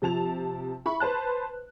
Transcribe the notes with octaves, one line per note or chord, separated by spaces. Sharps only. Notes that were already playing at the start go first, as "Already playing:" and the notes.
C3 F3 A5 F7
E4 B5 C#6
B4 C5 A5 F#6